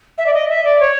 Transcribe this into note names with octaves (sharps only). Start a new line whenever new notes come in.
E5
D5
D#5
E5
D5
C#5